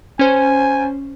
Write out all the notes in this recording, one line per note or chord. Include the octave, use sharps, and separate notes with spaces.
C#4 C5 G#5